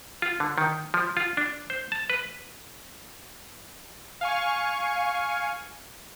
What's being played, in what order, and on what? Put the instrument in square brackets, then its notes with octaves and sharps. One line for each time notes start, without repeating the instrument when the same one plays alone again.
[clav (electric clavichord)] F4
D3
D#3
F3
F4
D4
C5
A5
B4
[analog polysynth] F5 G#5 C#6